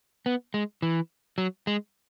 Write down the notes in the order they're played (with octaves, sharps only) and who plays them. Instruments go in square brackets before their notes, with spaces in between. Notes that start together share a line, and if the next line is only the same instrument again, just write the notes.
[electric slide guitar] B3
G#3
E3
F#3
G#3